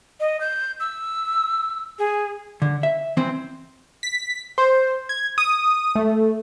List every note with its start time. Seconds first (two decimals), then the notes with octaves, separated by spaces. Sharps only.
0.20 D#5
0.41 G6
0.80 E6
1.99 G#4
2.62 D3
2.83 E5
3.17 E3 C4 C5
4.03 B6
4.58 C5
5.09 G#6
5.38 D#6
5.95 A3